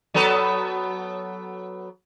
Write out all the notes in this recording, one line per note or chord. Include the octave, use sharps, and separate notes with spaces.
F#3 B3 A4